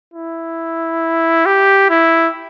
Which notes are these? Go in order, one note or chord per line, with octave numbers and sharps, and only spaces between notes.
E4
G4
E4